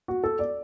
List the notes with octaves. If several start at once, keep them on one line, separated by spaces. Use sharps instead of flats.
F#4
A4
D5